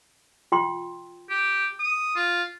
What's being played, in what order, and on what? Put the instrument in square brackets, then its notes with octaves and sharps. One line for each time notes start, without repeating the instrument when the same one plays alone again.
[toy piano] F4 G5 C6
[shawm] G4
D#6
F4